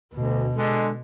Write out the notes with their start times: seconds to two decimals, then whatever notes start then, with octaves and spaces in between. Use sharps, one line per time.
0.14 D2 B2
0.56 D3 G#3